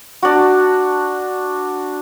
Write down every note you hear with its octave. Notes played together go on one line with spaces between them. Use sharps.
D4 F#4